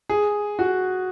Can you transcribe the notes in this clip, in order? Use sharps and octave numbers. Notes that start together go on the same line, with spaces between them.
G#4
F#4